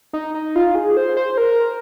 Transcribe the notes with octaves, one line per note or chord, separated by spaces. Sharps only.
D#4
D#4
F4
G#4
C5
C5
A#4